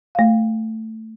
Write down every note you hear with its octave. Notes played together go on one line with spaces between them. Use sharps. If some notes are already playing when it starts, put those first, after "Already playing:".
A3 F5